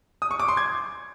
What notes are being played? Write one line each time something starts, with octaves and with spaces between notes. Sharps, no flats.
D#6
C#6
D6
C6
G#6